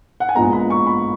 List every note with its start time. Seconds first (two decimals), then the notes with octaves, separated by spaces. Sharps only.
0.20 F#5
0.29 G#5
0.35 A#1 A#2 G#3 B3 A#5
0.53 B5
0.70 C#6
0.87 B5